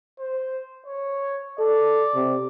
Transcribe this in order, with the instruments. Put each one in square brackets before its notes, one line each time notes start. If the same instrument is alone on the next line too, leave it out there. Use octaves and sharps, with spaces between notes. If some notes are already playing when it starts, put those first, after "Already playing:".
[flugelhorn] C5
C#5
[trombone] A4 [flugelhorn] D5
[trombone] C3